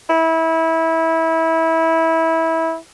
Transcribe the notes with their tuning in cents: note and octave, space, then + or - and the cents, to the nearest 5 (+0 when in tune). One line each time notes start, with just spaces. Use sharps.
E4 -20